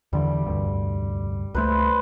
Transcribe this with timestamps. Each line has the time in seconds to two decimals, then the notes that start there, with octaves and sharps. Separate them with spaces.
0.13 E2 D3 E3 G3
0.46 F1 D2 G2
1.54 C#2 A3 B4 C5